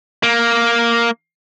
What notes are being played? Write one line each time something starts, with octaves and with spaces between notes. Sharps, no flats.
A#3